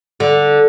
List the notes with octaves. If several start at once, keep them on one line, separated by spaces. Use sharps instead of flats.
D3